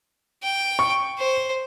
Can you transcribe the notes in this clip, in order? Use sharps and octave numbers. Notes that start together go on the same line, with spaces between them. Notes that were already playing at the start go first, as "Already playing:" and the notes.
G5
C#6
C5